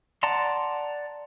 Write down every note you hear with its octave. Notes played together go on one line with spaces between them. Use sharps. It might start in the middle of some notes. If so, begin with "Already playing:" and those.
D5 F#5 A5 A#5 C6